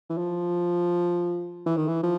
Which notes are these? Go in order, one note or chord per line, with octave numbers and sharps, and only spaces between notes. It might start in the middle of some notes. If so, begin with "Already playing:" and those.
E3
F3
E3
D#3
E3
F3